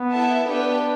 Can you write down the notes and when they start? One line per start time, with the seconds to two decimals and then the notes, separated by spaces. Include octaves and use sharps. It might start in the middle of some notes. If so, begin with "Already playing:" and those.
Already playing: B3
0.12 E4 A4 E5 A5
0.48 B3 D4 G4 B4 G5